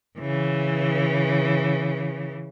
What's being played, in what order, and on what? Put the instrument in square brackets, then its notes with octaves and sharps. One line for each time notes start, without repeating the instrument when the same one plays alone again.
[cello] C#3 E3